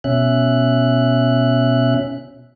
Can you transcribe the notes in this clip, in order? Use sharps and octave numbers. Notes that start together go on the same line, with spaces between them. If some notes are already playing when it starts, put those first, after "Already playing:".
B2 C#4 E5 F#6